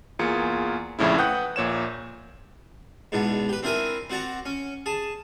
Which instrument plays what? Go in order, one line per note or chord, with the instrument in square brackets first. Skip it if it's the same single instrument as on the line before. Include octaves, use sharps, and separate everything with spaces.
[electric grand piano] E2 A#3 F4 G#4 C#7
A#1 F2 A2 C#3 E4
B4 F#5 G5 D#6 F#6 G6
A#1 A#2 C#5 E7
[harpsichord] E2 G#2 B2 D4
G4 B4
C4 D4 E4 A#4 G#5 A#5
C4 F#4 D5 A#5
C#4
G#4 A5